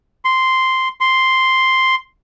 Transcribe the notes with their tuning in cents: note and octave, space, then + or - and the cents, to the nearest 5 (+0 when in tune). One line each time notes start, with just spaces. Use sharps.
C6 -5
C6 +0